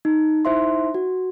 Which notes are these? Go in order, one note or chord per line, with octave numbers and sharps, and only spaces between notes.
D#4
D#4 E4 C5 E5 C6
F#4